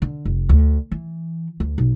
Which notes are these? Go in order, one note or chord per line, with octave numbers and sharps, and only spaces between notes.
D3
F1
D2
E3
D2
B1